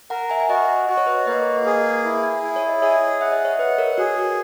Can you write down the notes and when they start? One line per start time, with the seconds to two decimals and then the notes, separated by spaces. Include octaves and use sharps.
0.10 A#4 F#5 A#5
0.30 E5 G#5
0.40 G#5
0.49 F#4 D#5 F#5
0.89 F#4 D#5
0.97 C#5
1.07 B4 D#5
1.27 A#3 B4 D#5
1.66 G#4
2.05 E4
2.43 E4
2.56 C#5
2.69 D#5
2.82 G#4 C#5 E5
3.21 E5 F#5
3.32 D#5
3.45 C#5 E5
3.59 B4 D#5 F#5
3.78 A#4 C#5
3.98 F#4 G#4
4.18 F#4